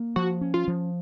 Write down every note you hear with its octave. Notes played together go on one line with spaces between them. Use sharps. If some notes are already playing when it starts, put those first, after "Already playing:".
Already playing: A#3
F3 F#4
C#4
F4
F3